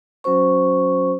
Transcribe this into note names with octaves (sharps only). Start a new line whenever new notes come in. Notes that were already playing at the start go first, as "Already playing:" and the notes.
F#3 C#4 F#4 C5 C#6